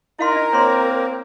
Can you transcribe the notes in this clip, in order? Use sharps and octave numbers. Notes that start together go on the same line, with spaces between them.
D#4 E4 A#4 F5 C6
D4 D#5
A#3 C4 C#5 C6